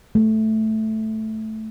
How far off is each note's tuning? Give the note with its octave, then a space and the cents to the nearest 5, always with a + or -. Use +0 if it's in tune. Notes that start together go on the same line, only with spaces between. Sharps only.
A3 -5